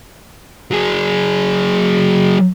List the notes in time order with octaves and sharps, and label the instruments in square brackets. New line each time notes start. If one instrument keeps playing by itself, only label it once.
[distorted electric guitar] F#3 G#4